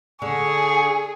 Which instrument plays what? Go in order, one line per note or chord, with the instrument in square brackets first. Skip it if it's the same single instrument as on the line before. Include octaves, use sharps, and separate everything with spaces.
[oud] D3 [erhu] G#4 [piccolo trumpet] C#6